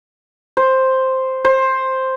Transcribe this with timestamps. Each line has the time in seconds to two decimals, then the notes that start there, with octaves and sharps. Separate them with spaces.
0.57 C5
1.45 C5